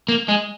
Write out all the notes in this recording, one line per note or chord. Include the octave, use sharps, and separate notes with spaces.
A#3
G#3